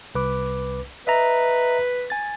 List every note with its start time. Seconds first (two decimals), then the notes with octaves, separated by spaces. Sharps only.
0.15 C2 B4 D6
1.07 B4 D#5 E5 A#5
2.10 G#5 A6